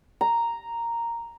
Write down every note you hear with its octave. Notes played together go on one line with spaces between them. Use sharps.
A#5